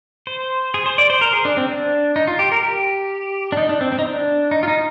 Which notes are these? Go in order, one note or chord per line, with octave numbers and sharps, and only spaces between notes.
C5
G#4
C5
D5
C5
A#4
G#4
D4
C4
D4
D#4
F4
G4
A#4
G4
D4
D#4
D4
C4
C4
D#4
D4
D#4
F4
D#4